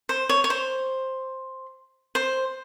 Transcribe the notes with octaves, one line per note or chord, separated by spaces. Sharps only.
C5
C#5
C#5
C5
C5